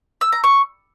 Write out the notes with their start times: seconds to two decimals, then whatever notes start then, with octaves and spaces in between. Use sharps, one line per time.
0.21 E6
0.32 A#5
0.44 C#6